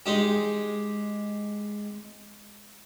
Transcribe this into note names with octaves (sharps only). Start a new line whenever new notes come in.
G#3 D#4 G4